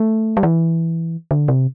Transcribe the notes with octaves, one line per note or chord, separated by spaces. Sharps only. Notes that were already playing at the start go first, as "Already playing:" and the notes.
Already playing: A3
G3
E3
D3
C3